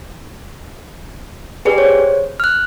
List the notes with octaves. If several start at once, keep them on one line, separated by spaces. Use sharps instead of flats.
G4 G#4 B4 D5
C5 C#5
F6 F#6